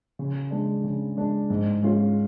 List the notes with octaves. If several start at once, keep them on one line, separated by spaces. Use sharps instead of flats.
C#3
G#3 D4
C#3
G#3 D4
G#2
G#3 C#4 F4